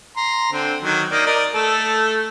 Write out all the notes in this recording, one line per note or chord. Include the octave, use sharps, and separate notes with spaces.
A#5 C6
D3 C4
D#3 F#3
A#3 D#4 D5
A#4 D5 D#5
A3 A4